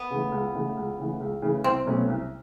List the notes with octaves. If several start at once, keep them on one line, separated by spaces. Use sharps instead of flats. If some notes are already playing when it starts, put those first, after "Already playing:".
Already playing: B3
C#3 E3 A3
C#2
C#3 E3 A3
C#2
C#3 E3 A3
C#2
C#3 E3 A3
C2 C4
B2 F#3 A3 C#4
C2